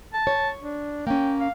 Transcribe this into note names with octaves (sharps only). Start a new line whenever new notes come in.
A5
C#5
D4
A#3 C#4 G5
F5